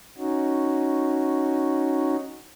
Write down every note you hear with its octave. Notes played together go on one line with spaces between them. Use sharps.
C#4 D#4 F#4